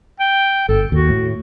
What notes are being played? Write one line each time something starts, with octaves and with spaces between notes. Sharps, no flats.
G5
G1 A4
D#2 F#4
A2